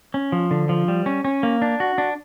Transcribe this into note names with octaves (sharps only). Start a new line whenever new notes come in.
C#4
F3
D3
F3
G3
C#4
C#4
A#3
D4
F#4
D4